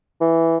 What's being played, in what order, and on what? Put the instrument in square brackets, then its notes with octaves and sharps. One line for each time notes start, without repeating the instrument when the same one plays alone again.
[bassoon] E3